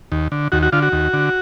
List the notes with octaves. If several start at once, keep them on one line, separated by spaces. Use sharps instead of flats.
D#2
D3
D#2 F#4
F#4
D3 F4
F#4
D#2
D3